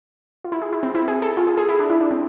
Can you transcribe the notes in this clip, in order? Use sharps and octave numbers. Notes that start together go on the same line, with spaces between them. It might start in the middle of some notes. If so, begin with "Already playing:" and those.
F4
E4
G#4
E4
C4
E4
G#4
A4
F4
G#4
G#4
E4
D4
E4
D4
C4